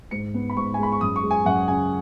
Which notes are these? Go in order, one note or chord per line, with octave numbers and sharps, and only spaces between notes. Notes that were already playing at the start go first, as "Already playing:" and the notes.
G#2 C#7
B3
B5
G#2 C#6
G#5
G#3 B5
C#6
F#2 D#6
C#6
G#3
G#5
F#2 F#5
C#3 G#5